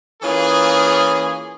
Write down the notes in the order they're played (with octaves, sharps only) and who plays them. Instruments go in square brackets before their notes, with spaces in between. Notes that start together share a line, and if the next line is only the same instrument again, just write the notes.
[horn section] E3 A#3 C#4 F4 G#4